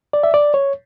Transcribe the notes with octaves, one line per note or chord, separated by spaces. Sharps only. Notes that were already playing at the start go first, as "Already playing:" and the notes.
D5
E5
D5
C#5